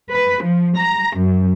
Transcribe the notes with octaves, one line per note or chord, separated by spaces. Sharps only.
B4
F3
A#5
F#2